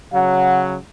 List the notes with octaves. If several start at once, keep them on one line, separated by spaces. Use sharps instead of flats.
C#3 F#3 F#5